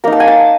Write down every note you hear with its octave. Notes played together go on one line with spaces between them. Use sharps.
A#3 D#4 A#5
A5
G#5
A5